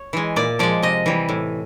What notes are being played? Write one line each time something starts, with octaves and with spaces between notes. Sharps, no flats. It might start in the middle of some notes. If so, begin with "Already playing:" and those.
Already playing: C#5
E3 G#3
A#2 D5
F3 G#3 D5
C3 D#5
E3 G3
A2